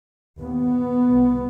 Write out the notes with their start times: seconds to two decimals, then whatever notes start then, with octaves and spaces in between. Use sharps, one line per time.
0.40 D#2 B3
1.09 C2 C3